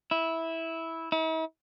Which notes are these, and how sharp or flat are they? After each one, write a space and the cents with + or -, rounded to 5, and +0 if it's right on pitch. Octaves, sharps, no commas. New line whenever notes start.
E4 -10
E4 -45